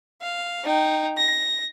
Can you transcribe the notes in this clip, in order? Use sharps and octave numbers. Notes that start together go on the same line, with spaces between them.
F5
D#4 G5
A#6